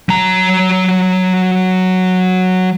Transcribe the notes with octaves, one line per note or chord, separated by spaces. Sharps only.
F#3 A#5